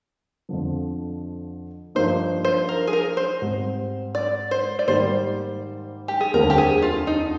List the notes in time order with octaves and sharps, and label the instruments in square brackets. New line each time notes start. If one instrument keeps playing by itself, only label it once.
[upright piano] F2 D3 F3
[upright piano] G2 F3 A#3 D#4 [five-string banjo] C5
[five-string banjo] C5
A#4
G#4
A#4
C5
[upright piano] G#2 G3 C4
[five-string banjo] D5
C5
D5
[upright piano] G#2 D#3 G3 A#3 [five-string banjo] C5
[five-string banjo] G4
G#4
[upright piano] F1 D#2 D3 G3 C4 [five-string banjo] A#4
[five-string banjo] G4
G#4
F4
D#4